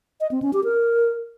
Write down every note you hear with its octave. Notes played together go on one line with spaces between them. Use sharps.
D#5
C4
C#4
G4
A#4